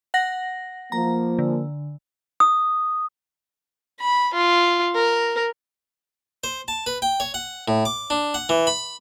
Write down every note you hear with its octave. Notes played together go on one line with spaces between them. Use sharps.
F#5 A#6
F3 A#3 A#5
D3
D#6
B5
F4
A#4
C5
A5
B4
G5
C#5
F#5
A2
D6
D4
F#5
E3
B5